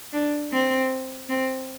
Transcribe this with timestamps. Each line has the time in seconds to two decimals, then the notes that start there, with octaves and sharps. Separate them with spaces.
0.13 D4
0.52 C4
1.29 C4